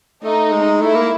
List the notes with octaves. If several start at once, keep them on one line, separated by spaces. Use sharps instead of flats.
A3 D#4
G#3
A3 E4
A#3